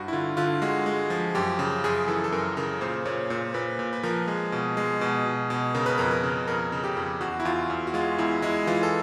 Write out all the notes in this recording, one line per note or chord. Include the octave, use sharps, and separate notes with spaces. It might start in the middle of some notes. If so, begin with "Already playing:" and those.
Already playing: G2 F#4
E4
D3 F4
D3 F4
G#3 F#4
G#3
F3
F#2 G4
C#3
F#2 G#4
E3 A4
A4
F#2 A#4
C#3 A#4
A#2 C5
A#2 C#5
A#2 C5
A#2 B4
A#2
B4
F3 A#4
G#3
B2
G#3
B2
B2
B2
C#3 A#4
B4
F2 A#4
A#4
C#3
F2 A#4
C#3
G4
F2
E2 F#4
E4
E2 F4
E2
F#4
G#3 F4
E2 E4
G#3 E4
E3 F4
A4